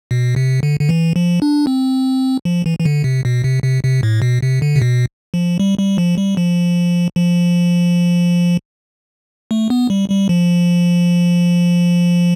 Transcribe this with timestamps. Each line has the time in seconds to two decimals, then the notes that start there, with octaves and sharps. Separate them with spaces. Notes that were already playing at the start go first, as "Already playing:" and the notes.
0.11 B2
0.36 C3
0.63 D3
0.80 D3
0.89 E3
1.16 F3
1.42 D4
1.67 C4
2.45 F3
2.66 E3
2.79 E3
2.85 D3
3.04 C3
3.25 B2
3.44 C3
3.63 C3
3.83 C3
4.03 A2
4.22 B2
4.42 C3
4.62 D3
4.76 C3
4.82 B2
5.34 F3
5.60 G3
5.79 G3
5.98 F3
6.18 G3
6.37 F3
7.16 F3
9.51 A3
9.70 B3
9.90 G3
10.10 G3
10.29 F3